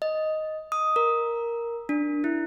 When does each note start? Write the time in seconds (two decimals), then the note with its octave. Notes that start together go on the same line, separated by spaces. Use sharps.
0.02 D#5
0.72 D#6
0.96 A#4
1.89 D4
2.24 E4